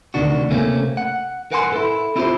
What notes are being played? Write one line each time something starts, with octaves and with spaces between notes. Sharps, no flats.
D2 C3 D#3 D4 F#4
C3 A3 A#3 C4 C#4
F#5
A#4 B4 F#5 G#5 A5 C6
E4 A4
C4 E4 F4 G4 A#4 C5